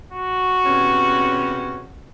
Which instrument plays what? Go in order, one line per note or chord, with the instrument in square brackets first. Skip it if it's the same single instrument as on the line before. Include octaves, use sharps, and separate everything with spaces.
[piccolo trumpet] F#4
[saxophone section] E2 C3 C#4